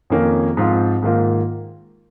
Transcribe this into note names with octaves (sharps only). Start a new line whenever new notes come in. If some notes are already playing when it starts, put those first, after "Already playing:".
F2 D#3 A#3 C#4
G#2 F3 C4 F4
G#2 D#3 A#3 F4